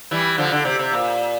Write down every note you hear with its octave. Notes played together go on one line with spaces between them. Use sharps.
E3 G3
D3 F3
D3
C3
C3
A#2